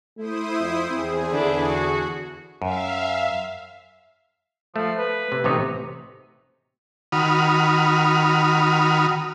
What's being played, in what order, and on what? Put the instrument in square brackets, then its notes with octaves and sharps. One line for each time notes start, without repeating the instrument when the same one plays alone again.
[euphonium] A3 [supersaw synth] E4 C5 D#6
[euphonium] F2
[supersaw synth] E2 G#4 [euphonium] C4
[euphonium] D3 [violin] D4 E4
[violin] F#4
[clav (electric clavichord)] F#2 [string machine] E5 F5
[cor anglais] F3 [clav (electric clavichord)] A3
[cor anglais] B4
[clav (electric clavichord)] C3
[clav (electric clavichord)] A1 C3 C#5 [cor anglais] D#4
[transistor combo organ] D#3 F#4 B5 D#6 F6